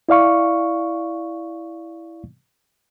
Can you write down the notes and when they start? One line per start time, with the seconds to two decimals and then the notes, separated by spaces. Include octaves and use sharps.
0.09 E4 D5 F5 C#6